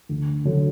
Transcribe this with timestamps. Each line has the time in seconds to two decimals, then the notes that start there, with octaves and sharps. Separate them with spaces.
0.09 D2
0.45 D3 F#3